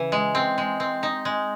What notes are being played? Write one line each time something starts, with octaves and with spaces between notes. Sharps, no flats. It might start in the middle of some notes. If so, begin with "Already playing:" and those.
Already playing: C#3 E3
G#3
C4
G#3
C4
D#4
G#3